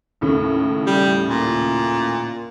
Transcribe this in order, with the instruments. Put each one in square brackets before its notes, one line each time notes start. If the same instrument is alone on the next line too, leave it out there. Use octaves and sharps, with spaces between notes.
[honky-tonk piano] D#2 A2 C#3
[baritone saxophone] G3
A#2